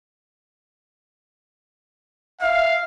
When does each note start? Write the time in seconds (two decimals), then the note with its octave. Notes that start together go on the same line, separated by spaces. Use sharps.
2.41 E5 F5